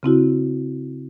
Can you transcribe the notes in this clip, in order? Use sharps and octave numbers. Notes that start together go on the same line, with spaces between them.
C#3 C4 E4 F#4